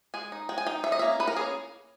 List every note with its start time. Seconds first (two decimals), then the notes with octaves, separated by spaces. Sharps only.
0.14 G#3 G#5
0.32 D#4
0.49 G#3 G5
0.58 G#5
0.66 D#4 G5
0.84 D#3 E5
0.92 D#5
0.99 A#3 C#4 E5
1.19 D#3 B4
1.28 A#4
1.36 A#3 G#4
1.41 C#4